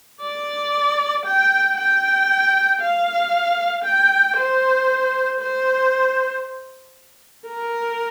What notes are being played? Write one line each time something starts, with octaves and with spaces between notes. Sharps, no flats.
D5
G5
G5
F5
G5
C5
C5
A#4